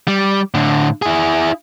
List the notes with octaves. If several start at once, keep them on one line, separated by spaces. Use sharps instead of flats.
G3
A2 D3
E4 G#4